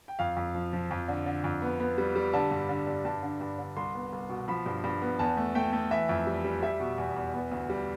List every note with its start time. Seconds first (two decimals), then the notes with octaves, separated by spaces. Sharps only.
0.08 G5
0.19 F2 F5
0.36 F2
0.55 F3
0.73 F3
0.91 F2
1.08 D3
1.26 D3
1.44 F2
1.62 B3
1.80 B3
1.98 G3
2.15 G3
2.33 D3 A5
2.51 G2
2.69 D3
2.87 G2
3.05 G2 A5
3.23 D3
3.41 G2
3.58 D3
3.76 C2 C6
3.94 B3
4.12 C2
4.29 B2
4.48 F3 B5
4.66 G2
4.84 G2
5.02 B3
5.19 E2 A5
5.37 A3
5.55 A3 G5
5.73 A3
5.91 E3 E5
6.09 F2
6.27 G3
6.44 G3
6.62 G3 E5
6.80 B2
6.98 E2
7.16 E2
7.34 B3
7.52 D2
7.70 G3